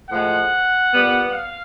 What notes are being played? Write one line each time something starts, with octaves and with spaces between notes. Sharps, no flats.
A2 F3 G#3 F#5
A#2 G3 B3
F5